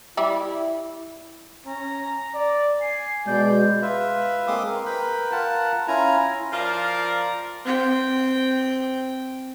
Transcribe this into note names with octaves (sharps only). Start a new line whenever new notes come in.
G3 E4 D5 E5
C#4 A#5
D5
G#5 C7
B2 G#3 D5 G6
F4 B4 E5
G#3 A#3 C4 C6 D6 D#6
A#4
A#4 B4 G5 B5
F4 A#4 F#5 A5
C#4 E4 F4 G#5 A#5
F3 F4 A#4 D5
C4 G5